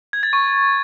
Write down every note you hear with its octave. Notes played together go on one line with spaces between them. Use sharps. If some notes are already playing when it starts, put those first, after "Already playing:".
G#6
A6
C#6